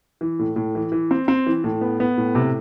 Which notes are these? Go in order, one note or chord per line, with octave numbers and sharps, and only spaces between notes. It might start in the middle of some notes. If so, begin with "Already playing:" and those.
E3
A2
A2
E3
E3
C4
C4
E3
A2
B3
B3
A2
C3